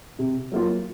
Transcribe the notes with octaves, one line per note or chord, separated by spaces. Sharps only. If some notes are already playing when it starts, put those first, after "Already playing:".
C3
F#3 A#3 F4